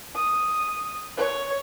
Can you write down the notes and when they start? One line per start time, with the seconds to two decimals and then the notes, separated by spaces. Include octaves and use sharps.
0.16 D#6
1.17 C#5